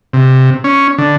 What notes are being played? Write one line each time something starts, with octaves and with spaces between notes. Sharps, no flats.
C3
C#4
D3